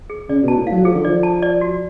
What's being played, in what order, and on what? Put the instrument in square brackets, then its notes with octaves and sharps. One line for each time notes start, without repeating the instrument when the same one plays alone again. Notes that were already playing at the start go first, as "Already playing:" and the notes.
[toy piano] G#4
[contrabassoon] C#3 [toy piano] D5
[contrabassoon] B2
[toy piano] A5
[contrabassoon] A2
[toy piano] F5
[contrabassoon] F#3
[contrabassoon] F3 [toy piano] G#4
[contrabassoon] D3
[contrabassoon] F3 [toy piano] D5
[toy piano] A5
D5
F#4